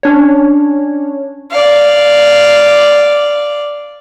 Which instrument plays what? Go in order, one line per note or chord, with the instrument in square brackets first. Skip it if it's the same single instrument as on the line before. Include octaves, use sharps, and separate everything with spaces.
[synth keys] C#4 D4 C#5
[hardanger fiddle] D5 F5